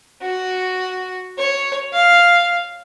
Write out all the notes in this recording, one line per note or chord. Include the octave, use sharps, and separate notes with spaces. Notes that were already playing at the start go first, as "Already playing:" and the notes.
F#4
C#5
F5